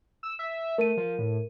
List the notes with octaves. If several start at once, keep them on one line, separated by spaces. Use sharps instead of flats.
E6
E5
A3 A#4 D#7
F3
A2